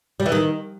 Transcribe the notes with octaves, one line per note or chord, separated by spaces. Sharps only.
G3
E3
D#3